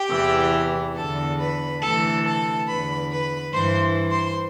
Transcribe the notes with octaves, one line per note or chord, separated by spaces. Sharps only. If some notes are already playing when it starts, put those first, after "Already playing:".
Already playing: G4 G5
E2 C3 E3
E2 D3 A4 A5
B4 B5
D2 C3 E3 A4 A5
A4 A5
E2 D3 B4 B5
B4 B5
G2 E3 C5 C6
C5 C6